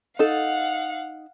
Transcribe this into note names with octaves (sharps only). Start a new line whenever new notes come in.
D#4 A4 F5 F#5